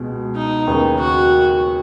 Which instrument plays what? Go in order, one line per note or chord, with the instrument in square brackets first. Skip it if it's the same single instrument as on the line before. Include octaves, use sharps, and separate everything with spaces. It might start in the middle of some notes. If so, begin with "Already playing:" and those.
Already playing: [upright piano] C#2 B2 G#3
[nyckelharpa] D#4
[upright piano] D#2 C#3 B3
[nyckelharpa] F#4